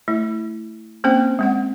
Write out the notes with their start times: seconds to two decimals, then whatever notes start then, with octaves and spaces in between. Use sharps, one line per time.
0.08 A3 E4
1.04 A#3 C4 C#4 C5 G5
1.39 G#3 C4 F#5